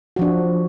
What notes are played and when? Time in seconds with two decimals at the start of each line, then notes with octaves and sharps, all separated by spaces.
0.16 F#4
0.19 F3
0.22 D4